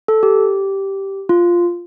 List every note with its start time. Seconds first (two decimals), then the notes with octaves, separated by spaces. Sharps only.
0.08 A4
0.23 G4
1.29 F4